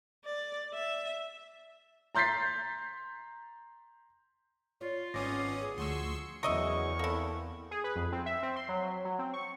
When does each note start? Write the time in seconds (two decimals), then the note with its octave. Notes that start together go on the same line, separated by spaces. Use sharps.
0.25 D5
0.74 E5
2.15 A#5 C6 G6 A6 B6 C7
4.81 F4 C#5
5.14 G#1 G2 A#3 B3 C#4 D6 D#6 A#6
5.61 G#4
5.78 D2 F3 F#4 C6 C#6 E6
6.43 E2 C#3 F#3 A#4 D#5 E5 C#6
6.99 A#3 C4 E4 A4
7.71 G#4
7.84 B4
7.96 F2
8.12 C4
8.26 E5
8.43 C4
8.56 C6
8.69 F#3
8.83 F#3
9.05 F#3
9.19 C4
9.33 C#6